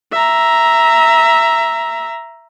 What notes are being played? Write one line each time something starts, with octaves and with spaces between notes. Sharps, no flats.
E5 A#5